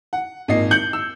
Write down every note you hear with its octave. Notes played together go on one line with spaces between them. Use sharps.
F#5
G#1 A#2 D#5 C7
G6 C#7 F#7
E6